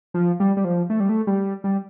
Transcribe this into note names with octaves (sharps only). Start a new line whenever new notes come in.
F3
G3
G3
F3
A3
G3
A3
G3
G3